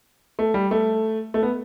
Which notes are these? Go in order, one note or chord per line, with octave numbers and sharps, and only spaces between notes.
A3
G3
A3
A3
B3